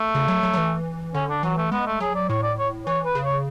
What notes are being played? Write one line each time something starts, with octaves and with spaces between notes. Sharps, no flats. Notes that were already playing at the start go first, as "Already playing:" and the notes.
Already playing: A3
C#3
F#3
F#3
F#3
E3
D3 C#4
D4
E3 F#3
A3
G#3 B3
A3
F#3 G#4
D5
A2 C#5
D5
C#5
E3 C#5
B4
C#3
C#5